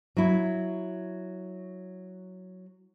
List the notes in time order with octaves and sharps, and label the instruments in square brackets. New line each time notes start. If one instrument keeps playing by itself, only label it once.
[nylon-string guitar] F#3 E4